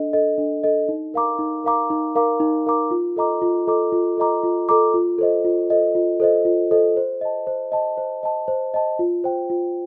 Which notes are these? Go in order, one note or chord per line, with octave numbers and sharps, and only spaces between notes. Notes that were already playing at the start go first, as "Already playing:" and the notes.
Already playing: D4 A4 D#5
A4 D#5
D4
A4 D#5
D#4
A#4 F5 A#5 D6
D#4
A#4 F5 A#5 D6
D#4
A#4 F5 A#5 D6
D#4
A#4 F5 A#5 D6
F4
A4 D#5 A#5 D6
F4
A4 D#5 A#5 D6
F4
A4 D#5 A#5 D6
F4
A4 D#5 A#5 D6
F4
A4 C5 D#5
F4
A4 C5 D#5
F4
A4 C5 D#5
F4
A4 C5 D#5
C5
D#5 A5
C5
D#5 A5
C5
D#5 A5
C5
D#5 A5
F4
C5 G5
F4